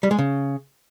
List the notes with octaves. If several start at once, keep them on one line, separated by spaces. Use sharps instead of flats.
G3
G#3
C#3